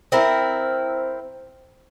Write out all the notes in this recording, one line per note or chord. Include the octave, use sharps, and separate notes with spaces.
C4 E4 A#4